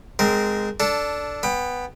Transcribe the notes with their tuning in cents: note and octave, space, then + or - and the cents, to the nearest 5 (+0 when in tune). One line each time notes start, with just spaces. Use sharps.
G#3 +0 C4 -25 A#4 +0
D4 -10 A4 +5
B3 +0 G5 +25